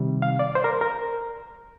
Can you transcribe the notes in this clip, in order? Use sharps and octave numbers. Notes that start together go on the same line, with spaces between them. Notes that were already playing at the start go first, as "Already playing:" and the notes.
Already playing: C3 D#3 G3
F5
D5
C5
A#4
A#4